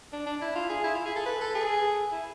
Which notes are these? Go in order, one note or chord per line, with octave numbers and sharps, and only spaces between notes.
D4
D4
E4
F4
G#4
E4
F4
G#4
A4
B4
A4
G#4
E4